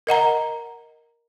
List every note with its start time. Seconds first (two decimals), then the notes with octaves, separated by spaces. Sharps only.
0.07 A#4 D#5 F#5 A#5